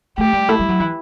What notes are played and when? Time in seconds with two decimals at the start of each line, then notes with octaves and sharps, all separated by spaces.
0.18 A3 G4
0.33 G3
0.49 A3 E4
0.59 G3
0.69 F#3
0.80 E3